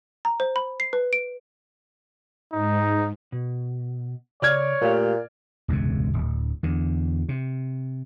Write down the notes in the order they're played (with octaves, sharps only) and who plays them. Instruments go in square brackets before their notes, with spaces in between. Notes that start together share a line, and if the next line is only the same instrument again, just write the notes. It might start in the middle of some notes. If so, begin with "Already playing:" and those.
[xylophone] A#5
C5
B5
C7
B4
D7
[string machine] G#2 [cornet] D#4
[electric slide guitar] B2
[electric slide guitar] C#3 [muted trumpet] C#5 [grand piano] D5 F6 G#6
[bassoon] A#2 [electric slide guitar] A3 G4 F5
[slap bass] E1 C#2 G#2 C3
D1
E2 D3
C3